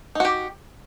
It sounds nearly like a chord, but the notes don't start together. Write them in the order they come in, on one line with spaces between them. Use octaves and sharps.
D#4 F#4 G4